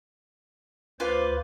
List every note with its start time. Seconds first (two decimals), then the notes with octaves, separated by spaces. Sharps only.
1.00 D2 F4 B4 C5 D6